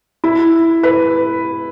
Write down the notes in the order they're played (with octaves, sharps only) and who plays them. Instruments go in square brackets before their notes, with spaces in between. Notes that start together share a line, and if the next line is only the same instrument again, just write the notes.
[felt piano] E4
B4